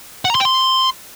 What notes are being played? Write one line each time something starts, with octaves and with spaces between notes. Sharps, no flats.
F#5
A#5
C6
G5
C6